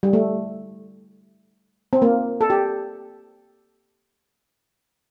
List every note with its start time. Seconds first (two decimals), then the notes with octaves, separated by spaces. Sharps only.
0.03 G3
0.13 A3
1.93 C4
2.02 A#3
2.41 A4
2.50 G4